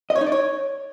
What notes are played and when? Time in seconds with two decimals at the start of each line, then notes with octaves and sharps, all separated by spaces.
0.10 D#5
0.16 C#5
0.21 D#4
0.26 D5
0.32 C#5